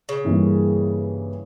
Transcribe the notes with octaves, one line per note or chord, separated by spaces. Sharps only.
C#3
G2 E3 G3 A#3